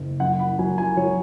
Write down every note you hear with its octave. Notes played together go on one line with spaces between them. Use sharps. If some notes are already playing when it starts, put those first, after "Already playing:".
Already playing: F#1
F#2 F#5
B5
F#3 G#5
G#5
F#3 C#5